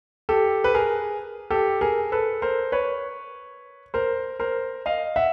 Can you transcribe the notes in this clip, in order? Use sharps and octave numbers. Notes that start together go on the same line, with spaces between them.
G4 A4
B4
G#4 A#4
G4 A4
G#4 A#4
A4 B4
A#4 C5
B4 C#5
A#4 C5
A#4 C5
D#5 F5
E5 F#5